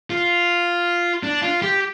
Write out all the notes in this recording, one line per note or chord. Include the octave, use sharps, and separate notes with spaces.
F4
D4
F4
G4